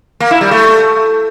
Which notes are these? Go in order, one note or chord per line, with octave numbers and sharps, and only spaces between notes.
A#3
E4
G3
A3